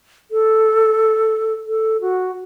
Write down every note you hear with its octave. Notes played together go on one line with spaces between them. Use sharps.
A4
A4
F#4